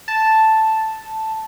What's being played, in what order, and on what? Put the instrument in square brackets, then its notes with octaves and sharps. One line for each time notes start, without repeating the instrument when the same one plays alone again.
[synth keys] A5